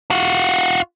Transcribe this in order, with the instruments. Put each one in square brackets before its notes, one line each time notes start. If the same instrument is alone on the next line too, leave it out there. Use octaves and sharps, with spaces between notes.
[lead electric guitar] F4 F#4